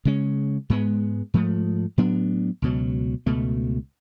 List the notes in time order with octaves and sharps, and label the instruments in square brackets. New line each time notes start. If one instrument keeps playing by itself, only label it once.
[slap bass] C#3 G#3 C#4
G#2 G#3 B3
G#2 F3 A3
A2 F#3 B3 D4
C#2 B2 F#3
C#2 B2 A3